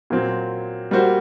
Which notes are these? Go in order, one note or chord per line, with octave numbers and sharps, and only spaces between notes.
A#2 F#3 C4
G3 A#3 F#4 C5